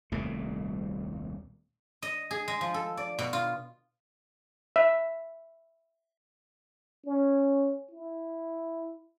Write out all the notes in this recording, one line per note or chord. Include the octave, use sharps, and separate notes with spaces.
D#1 C2 A#2 A3
D#5
G#4
G#3
F3
A4
D5
B2
F4
E5
C#4
E4